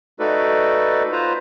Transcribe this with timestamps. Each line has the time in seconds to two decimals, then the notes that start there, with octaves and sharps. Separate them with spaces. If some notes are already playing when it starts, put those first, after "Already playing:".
0.20 A3 D#4 F#4 A4 B4 D5
1.12 F4 B4 C5 A#5